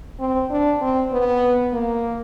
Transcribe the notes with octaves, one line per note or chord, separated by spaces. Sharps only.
C4
D4
C4
B3
A#3